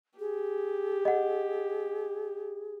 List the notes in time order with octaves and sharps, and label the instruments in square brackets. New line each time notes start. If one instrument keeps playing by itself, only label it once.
[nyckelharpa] G4 [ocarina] G#4
[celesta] D#5 F#5